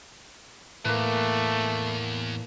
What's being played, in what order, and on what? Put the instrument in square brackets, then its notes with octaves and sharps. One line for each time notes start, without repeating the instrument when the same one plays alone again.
[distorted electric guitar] E2 [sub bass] A2 [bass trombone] A3 [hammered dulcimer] A#3 B4